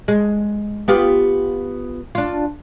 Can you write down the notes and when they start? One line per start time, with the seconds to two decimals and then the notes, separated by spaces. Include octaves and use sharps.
0.08 G#3
0.88 B3 F4 G4
2.15 D4 F4